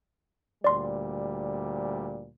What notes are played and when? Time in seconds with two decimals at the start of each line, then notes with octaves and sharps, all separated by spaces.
0.64 D2 A#2 G3 D5 C6